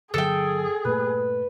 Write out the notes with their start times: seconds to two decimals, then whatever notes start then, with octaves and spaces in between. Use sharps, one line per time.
0.14 G2 D3 F#3 G#4 A4 G5
0.85 G2 A#2 A3 B4